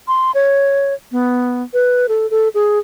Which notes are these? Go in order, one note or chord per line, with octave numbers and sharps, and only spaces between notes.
C6
C#5
B3
B4
A4
A4
G#4